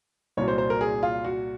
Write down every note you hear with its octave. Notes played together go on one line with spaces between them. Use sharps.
C2 A#2 F#3 C#5
C5
C5
A#4
G#4
F4
F#4